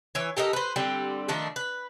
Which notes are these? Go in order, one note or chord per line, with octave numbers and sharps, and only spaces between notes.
E3 C#5
G4 A4 A#4 D#5
B4 C5
D3 G3 C4 G4
D#3 F3 A3 D4
B4